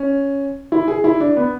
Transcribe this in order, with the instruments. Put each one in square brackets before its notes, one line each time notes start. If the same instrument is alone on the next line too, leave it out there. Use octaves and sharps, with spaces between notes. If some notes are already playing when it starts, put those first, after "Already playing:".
Already playing: [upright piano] C#4
E4
G#4
E4
D4
B3